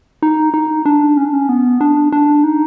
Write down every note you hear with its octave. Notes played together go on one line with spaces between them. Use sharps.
D#4
D#4
D4
C#4
D4
C#4
B3
D4
D4
D#4